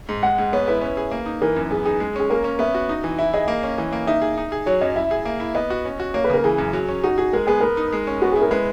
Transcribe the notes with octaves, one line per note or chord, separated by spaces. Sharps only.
G#2
G#3 F#5
G#2
B3 C#5
E4 B4
C#4
G#4
A#3
D#4
E3 A#4
F#2
B3 G#4
D#4 G#4
G#3
C#4 G#4
A#3 A#4
C#4
B3 E5
F#4
D#4
E3
E4 E5
G#4 D#5
A#3
C#4
E3
A#3
D#4 E5
G#4
D#4
G#4
F#3 C#5
F#2 D#5
E4 E5
G#4
A#3
E4
B3 D#5
F#4
C#4
F#4
A#3 C#5
B4
C#3 A#4
E3 G#4
F#2
F#3
C#4
D#4 F#4
F#4 G#4
G#3 A#4
B3 G#4
B3 A#4
D#4
G#3
C#4
B3 F#4
E4 G#4
A#4
G#3 B4